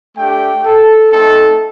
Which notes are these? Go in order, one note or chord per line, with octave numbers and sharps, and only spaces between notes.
A3 D4 G4 G5
A4
A3 C4 D#4 A4